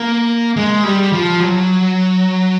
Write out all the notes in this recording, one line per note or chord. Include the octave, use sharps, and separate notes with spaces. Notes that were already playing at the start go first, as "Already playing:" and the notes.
Already playing: A#3
G#3
G3
F3
F#3